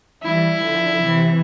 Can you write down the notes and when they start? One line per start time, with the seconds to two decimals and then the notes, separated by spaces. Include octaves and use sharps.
0.23 E3 G3 E4
0.60 D3 F3
0.99 C3 E3